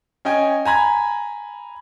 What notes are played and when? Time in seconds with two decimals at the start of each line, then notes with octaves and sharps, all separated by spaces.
0.25 C#4 D#5 G5 G#5
0.65 G#5 A#5 B5 G#6